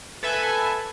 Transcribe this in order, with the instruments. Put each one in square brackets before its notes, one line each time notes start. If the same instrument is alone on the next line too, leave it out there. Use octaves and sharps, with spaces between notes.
[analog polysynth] A4 B4 E5 G#5